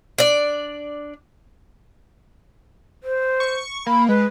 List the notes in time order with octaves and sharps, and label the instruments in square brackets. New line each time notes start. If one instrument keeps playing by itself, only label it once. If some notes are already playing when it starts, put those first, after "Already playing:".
[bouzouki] D4 D5
[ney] C5
[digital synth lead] C#6
[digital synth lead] A#3 [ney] B5
[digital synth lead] G#3 [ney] B4